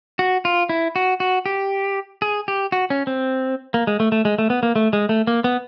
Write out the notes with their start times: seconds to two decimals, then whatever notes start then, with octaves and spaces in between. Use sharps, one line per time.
0.19 F#4
0.45 F4
0.69 E4
0.96 F#4
1.20 F#4
1.46 G4
2.22 G#4
2.48 G4
2.72 F#4
2.90 C#4
3.07 C4
3.74 A#3
3.87 G#3
4.00 A3
4.12 A3
4.25 G#3
4.39 A3
4.50 B3
4.63 A#3
4.76 A3
4.93 G#3
5.09 A3
5.27 A#3
5.44 B3